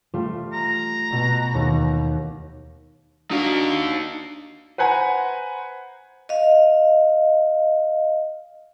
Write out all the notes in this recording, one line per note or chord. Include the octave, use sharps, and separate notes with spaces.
G3 A3 F4
A#5
B2
D#2
D4 D#4 F#4 F5
B4 C5 F#5 G#5 A#5
D#5 F5